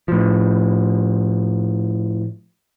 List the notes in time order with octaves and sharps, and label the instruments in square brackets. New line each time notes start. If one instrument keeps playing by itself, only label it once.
[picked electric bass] A2 F3